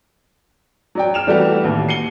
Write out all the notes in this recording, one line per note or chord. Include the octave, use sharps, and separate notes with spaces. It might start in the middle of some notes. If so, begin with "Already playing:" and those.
F#3 D5 G5
F6 E7 F7
E3 G3 A3 F#4 G4
A1 D#2
C7 C#7 D#7 G7